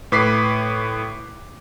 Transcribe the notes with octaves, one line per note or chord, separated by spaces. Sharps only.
A2 B4 D6 B6 C7